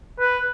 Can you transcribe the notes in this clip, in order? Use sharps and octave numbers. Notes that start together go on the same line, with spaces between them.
B4